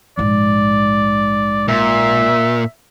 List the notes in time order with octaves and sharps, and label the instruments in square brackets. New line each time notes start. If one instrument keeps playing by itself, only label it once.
[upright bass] A#1 G#2 [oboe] D5
[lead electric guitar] A#2 [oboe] E5